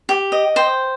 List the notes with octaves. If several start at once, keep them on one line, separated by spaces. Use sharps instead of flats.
G4
D#5
C5 G5